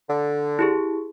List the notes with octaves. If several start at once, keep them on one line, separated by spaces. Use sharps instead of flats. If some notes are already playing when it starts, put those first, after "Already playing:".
D3
E4 G4 G#4